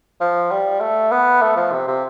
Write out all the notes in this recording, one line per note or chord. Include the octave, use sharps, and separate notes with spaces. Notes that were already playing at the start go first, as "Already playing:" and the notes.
F3
G3
A3
B3
A3
F3
C3
C3